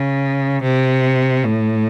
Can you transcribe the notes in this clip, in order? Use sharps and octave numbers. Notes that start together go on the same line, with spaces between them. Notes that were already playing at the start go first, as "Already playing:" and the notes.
Already playing: C#3
C3
A2